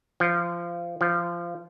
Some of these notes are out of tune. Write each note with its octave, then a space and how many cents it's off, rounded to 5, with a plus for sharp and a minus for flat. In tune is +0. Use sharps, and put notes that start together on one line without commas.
F3 -20
F3 -20